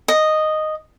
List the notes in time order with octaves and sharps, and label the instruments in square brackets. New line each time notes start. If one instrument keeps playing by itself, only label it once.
[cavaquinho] D#5